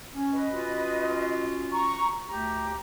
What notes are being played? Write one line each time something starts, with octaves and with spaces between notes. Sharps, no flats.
C#4
B4 D#5
C#4 F4 F#4
A#5 C#6
D2 A3 G4 A#5